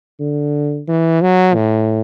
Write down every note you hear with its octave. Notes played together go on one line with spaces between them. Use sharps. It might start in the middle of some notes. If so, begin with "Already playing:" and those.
D3
E3
F#3
A2